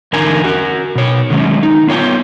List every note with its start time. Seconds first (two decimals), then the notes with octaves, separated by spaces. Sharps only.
0.13 E2 D3 D#4 A#4 G#5 A#5
0.44 F#4 A#4
0.95 B2 C#5
1.30 D3 D#3 F#3 G#3 A3 C#4
1.63 D#4
1.87 B3 F4 C#5 G5